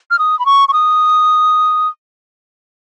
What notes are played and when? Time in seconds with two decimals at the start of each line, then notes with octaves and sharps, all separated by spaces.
0.11 F6
0.19 D#6
0.39 B5
0.46 C#6
0.68 C#6
0.73 D#6